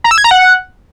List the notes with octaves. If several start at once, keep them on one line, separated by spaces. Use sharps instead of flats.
A#5
E6
G#6
A#5
F#5